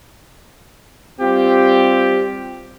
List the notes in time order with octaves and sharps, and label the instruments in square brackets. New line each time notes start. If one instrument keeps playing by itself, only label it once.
[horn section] G3 C4 F4 G4